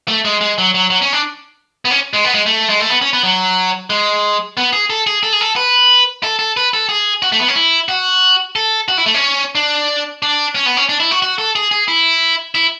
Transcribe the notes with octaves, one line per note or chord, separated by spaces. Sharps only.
A3
G#3
G#3
F#3
F#3
F#3
C#4
D4
B3
C#4
G#3
B3
G#3
A3
G#3
A3
B3
C#4
B3
F#3
G#3
B3
G#4
A4
G#4
A4
G#4
A4
B4
A4
A4
B4
A4
G#4
F#4
A3
B3
C#4
E4
F#4
A4
F#4
E4
A3
C#4
D4
D4
C#4
B3
C#4
D4
E4
F#4
F#4
A4
G#4
G#4
E4
E4